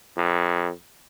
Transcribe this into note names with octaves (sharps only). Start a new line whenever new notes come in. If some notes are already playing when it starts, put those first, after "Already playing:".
F2